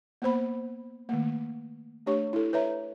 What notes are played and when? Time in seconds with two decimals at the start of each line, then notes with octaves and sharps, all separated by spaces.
0.22 A#3 B3 C5 B5
1.09 D#3 A3 A#3
2.06 A3 D4 G4 C#5 C#6
2.33 E4 A4
2.53 B4 C#5 E5 A#5